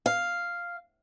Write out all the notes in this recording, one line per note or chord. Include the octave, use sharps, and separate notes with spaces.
F5